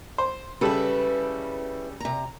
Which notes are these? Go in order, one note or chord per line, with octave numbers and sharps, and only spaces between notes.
C5
C#3 G3 E4 A4 B4
C3 A#5